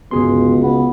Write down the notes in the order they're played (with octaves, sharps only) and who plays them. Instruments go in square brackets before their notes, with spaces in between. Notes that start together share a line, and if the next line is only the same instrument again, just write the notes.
[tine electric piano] G1 G#4 C6 [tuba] C#2 [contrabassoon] B2
[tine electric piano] C#3 [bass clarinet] B3